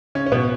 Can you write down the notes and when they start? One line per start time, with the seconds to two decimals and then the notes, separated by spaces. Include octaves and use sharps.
0.15 C#3 C#4
0.26 C#4
0.32 B2 B3